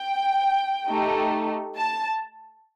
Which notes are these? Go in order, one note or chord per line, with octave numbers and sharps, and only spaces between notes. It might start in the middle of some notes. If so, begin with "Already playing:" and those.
Already playing: G5
A3 D#4 G4
A5